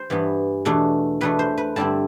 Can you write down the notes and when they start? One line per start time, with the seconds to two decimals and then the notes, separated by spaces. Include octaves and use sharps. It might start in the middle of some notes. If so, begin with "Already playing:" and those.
Already playing: C5
0.10 G2 E3 B3
0.65 E2 B2 A3 D4
1.21 E2 B2 A3 D4 B4
1.39 C5
1.58 B4
1.76 G2 D3 G3 C4 E4 A5